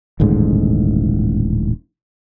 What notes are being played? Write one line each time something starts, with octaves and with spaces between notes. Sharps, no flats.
D#1 A1 G#2 D3